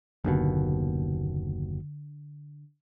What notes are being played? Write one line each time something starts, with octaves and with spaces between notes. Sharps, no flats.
F#1 D#2 B2 D3